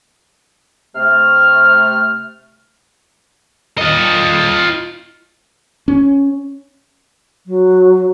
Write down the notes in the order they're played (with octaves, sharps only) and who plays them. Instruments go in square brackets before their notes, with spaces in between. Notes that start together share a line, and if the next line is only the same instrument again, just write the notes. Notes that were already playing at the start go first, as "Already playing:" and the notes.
[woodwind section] C3 A3 F6
[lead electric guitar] F4 D#5
[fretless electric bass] C#4
[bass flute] F#3